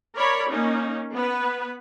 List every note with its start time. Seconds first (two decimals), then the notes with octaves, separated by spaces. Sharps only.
0.16 A#4 C#5 D5 B5
0.49 A#3 C#4 D#4
1.14 B3 B4